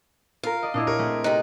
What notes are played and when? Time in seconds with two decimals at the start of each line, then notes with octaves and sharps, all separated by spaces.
0.43 F4 A#4 F5
0.62 D5 D#5
0.74 A#2 D4 E4 D#5
0.87 A#4 C#5
0.99 A3 C4 G#4
1.24 C3 D#4 F#6